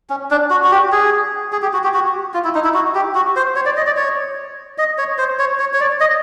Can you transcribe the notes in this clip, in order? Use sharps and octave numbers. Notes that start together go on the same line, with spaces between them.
C#4
D4
F#4
F#4
G4
G#4
G#4
G4
F#4
G4
F#4
F4
E4
D#4
E4
F#4
G4
F#4
C5
C#5
D5
D#5
D5
C#5
D#5
C#5
C5
C#5
C#5
C#5
D5
D#5